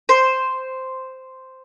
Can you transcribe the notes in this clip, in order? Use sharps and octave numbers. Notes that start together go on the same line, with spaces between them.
C5